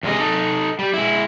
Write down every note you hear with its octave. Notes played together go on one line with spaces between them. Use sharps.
E2 C3 D#3 G#3 D#5
D#4 A4
G3
G#3 E4